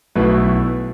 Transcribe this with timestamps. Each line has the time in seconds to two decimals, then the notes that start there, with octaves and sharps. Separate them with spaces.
0.15 B1 B2 A3 E4 B4